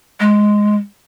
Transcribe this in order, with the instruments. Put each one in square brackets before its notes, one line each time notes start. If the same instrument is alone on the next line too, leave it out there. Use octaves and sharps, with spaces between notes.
[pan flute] G#3